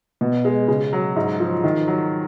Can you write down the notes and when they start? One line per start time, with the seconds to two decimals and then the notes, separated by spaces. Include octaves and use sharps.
0.21 B2
0.45 G#3
0.68 C#3
0.93 F#3
1.16 G#2
1.40 F3
1.64 D#3
1.87 F#3